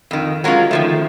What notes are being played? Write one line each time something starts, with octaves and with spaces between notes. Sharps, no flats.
F2 D#3
F#3 G#3 A#3 C#4 F4
D#3 F3 A3